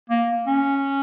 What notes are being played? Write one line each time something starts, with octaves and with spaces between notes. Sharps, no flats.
A#3
C#4